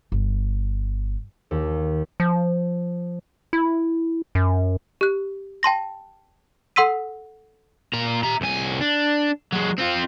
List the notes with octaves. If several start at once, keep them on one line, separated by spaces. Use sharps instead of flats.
G1
D#2
F3
E4
F#2
G4 F#6
G5 A5 C6 A#6
A4 F#5 C6 E6 B6 D#7
A#2 A#5
E5 A#5
C2 G#5
D4
F#3 G#3
C4 F4